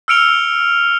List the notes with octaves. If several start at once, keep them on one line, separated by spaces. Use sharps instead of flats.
E6 F6 C#7 D7 F7 G7